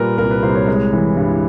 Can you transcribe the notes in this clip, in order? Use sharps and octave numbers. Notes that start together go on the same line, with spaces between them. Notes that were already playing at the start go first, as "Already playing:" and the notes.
Already playing: A#2 G3 A#4 B4
C2 A#4
B4
C2 C5
C#5
G#3
E3
G2